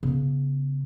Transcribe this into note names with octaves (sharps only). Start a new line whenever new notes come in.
C#3 B3